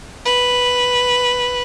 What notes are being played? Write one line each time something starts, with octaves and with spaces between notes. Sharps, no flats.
B4